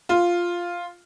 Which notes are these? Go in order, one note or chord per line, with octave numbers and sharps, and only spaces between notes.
F4